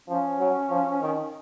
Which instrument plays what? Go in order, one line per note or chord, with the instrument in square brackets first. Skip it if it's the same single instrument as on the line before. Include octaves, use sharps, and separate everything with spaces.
[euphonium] F3 [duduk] C#4
[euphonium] F#3
F3
D#3